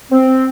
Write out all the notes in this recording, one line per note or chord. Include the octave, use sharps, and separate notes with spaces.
C4